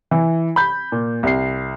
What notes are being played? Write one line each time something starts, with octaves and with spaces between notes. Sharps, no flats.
E3
B5 G6
A#2
C2 C7